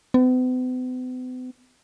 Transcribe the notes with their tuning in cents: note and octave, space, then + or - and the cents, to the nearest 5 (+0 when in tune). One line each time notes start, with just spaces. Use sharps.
B3 +45